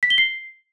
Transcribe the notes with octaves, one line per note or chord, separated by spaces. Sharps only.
B6
G7
C7